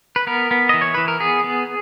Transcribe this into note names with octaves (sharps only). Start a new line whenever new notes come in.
B4
B3 A#4
B3
E3 D#5
C#5
E3 B4
A#4
B3 G#4
B3